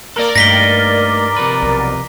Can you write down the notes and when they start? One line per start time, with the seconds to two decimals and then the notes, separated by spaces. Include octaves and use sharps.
0.16 A#3 A4 A#4 D5
0.36 G2 A3 A#3 D#4 A#6 B6 G7
1.37 C3 F3 B4
1.63 B1